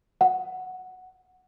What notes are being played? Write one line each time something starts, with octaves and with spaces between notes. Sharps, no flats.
F#5